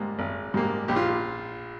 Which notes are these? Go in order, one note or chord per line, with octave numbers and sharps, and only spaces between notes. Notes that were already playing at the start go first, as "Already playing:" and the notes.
Already playing: G#2 G3 A#3
G#1
G#2 G3 A#3
A#1 G4
F4